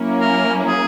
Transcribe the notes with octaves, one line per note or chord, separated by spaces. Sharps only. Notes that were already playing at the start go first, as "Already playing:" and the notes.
Already playing: F#3 A#3 C#4 E4
A#4
G#4